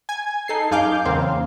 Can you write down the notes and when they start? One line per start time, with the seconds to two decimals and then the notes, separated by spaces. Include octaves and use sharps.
0.09 G#5 G#6
0.48 D#4 A4 C7
0.71 F#2 D#4 G#4 F5 D6 G6
1.05 E2 C#3 A#3 C4 F5